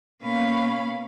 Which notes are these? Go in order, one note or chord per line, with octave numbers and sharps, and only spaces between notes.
B2 A#3 C#4 F5 B5